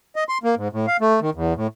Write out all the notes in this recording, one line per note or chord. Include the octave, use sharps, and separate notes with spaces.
D#5
C6
A#3
G#2
A2
F5
A3
D#3
E2
A2